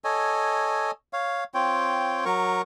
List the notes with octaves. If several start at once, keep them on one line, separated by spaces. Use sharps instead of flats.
A4 C#5 D#5 G#5
C#5 F5
C4 F4 C#5 G5
F#3 A#4 C#6